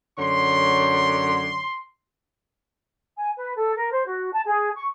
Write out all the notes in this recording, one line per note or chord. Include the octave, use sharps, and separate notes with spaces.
F#2 D3 C#5 C6
G#5
B4
A4
A#4
C5
F#4
A5
G#4
C#6